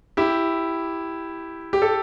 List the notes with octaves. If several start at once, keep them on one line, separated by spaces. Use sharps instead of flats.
E4 G4
G4
A4